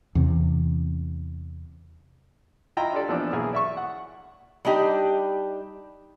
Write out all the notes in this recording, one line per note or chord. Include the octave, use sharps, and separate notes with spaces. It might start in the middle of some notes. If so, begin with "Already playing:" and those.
E2 C3
E4 F4 D#5 G5 A#5
D4 F4 G4 A4 D5
A#2 E3 F3 B3 C4 D4
B1 A#3 E4 G#4 F6
D5 E5 C#6
F#5
G3 D4 D#4 G4